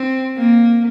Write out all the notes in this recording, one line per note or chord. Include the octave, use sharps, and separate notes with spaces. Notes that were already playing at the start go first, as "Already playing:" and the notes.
Already playing: C4
A#3